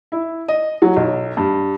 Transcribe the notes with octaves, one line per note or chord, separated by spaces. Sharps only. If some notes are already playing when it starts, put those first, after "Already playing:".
E4
D#5
F#3
B1
G2